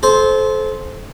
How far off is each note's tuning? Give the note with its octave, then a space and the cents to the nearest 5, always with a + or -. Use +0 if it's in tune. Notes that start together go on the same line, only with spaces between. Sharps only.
A4 -30 C5 +0